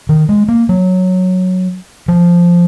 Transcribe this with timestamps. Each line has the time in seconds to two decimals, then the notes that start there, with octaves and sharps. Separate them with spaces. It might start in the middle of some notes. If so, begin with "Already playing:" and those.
0.09 D#3
0.29 G#3
0.48 A#3
0.69 F#3
2.08 F3